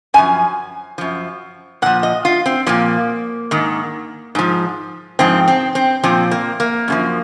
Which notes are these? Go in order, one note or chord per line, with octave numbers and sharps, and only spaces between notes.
F#2 F3 G#5
F#2 F3
A#2 F3 F#5
D#5
F4
C4
A#2 F3 A#3
G#2 D#3
G#2 F3
G#2 F3 C4
C4
C4
A#2 F3 C4
A#3
A#3
F#2 C#3 F3